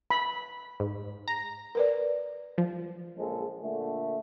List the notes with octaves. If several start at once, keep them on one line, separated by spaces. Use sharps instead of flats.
B5
G#2
A#5
A#4 B4 D5
F3
A#1 C#3 G#3 A4 C5
A#2 D3 A3